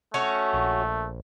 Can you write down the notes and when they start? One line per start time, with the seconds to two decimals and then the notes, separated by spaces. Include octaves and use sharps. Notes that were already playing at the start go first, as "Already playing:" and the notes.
0.14 A3 C#4 F#4 C#5
0.53 A#1